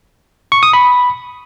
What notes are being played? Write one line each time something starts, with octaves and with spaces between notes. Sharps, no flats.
C#6
D#6
B5